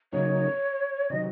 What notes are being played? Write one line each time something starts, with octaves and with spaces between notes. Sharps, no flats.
C#3 F#3 A#3 D#4 C#5
C3 D#3 F#3 D#5